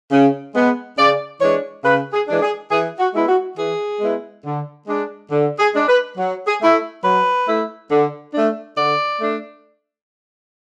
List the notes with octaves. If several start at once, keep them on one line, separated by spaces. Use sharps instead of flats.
C#3
G#3 B3
C#3 D5
E3 G#3 D4 C#5
C#3 B4
G#4
E3 G#3 D4
G#4
E3 G#4
F#4
G#3 B3 E4
F#4
E3 G#4
G#3 B3 E4
D3
G#3 D4
D3
G#4
G#3 D4
B4
F#3
G#4
A3 E4
F#3 B4
A3 E4
D3
A3 D4
D3 D5
A3 D4